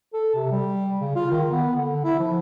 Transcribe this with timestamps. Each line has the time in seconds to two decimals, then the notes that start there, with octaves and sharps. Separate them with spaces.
0.13 A4
0.35 C3
0.52 G3
1.01 C#3
1.16 F4
1.31 D#3
1.51 B3
1.75 D3
2.04 E4
2.19 F3